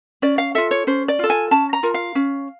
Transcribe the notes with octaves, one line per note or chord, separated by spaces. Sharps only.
C#4 D5
F5
F4 A4 E5
C#5
C#4 C5
D5
F4 A4
G#5
C#4 A5
A#5
F4 A#4
F5
C#4